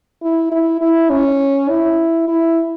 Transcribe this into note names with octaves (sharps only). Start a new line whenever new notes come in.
E4
E4
E4
C#4
E4
E4